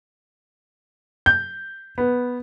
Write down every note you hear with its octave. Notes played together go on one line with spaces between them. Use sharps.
G6
B3